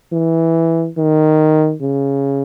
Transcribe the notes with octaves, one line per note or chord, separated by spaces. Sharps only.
E3
D#3
C#3